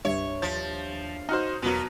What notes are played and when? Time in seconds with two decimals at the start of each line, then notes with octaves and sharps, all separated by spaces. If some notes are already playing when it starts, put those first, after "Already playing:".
0.05 C2 G2 C#5 E5
0.42 D#2 F3 A6
1.29 D#4 F#4 C5 F6
1.62 E2 B2 F#3 A#3 B3